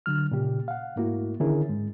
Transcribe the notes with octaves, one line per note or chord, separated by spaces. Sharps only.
D3 F#3 F6
A#2 C#3 G4
F5 F#5
G#2 A3 A#3 E4 F#4
D3 D#3 C#4 E4 G#4 A#4
G#2 G#3